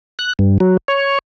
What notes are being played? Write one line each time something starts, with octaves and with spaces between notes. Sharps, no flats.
F#6
G2
F#3
C#5